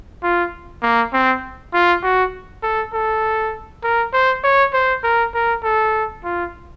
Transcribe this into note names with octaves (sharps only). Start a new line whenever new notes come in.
F4
A#3
C4
F4
F#4
A4
A4
A#4
C5
C#5
C5
A#4
A#4
A4
F4